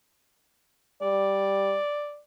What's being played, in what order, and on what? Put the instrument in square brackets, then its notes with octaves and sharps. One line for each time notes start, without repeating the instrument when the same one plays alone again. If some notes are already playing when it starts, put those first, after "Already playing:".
[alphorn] G3 [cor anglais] D5